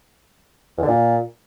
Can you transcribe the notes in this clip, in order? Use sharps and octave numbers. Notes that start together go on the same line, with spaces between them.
E2
D3
A#2